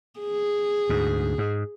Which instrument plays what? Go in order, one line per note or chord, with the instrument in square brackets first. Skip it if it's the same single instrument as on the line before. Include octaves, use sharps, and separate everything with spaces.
[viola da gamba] G#4
[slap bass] D2 G#2
G#2